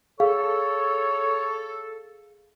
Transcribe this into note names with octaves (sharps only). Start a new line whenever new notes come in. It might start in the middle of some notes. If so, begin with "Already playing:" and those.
G#4 A4 C#5 F5